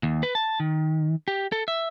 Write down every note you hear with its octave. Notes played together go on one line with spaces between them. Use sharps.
D#2
B4
A5
D#3
G4
A4
E5